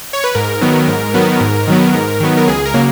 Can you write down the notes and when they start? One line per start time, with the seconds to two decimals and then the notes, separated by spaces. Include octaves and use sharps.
0.13 C#5
0.24 B4
0.35 G#2 A#4
0.61 D#3 F#3 B3
0.88 G#2
1.14 D#3 F#3 B3
1.41 G#2
1.68 D#3 F#3 B3
1.94 G#2
2.20 D#3 F#3 B3
2.37 A#4
2.48 C#2 G#4
2.65 A#4
2.74 C#3 F#3 A#3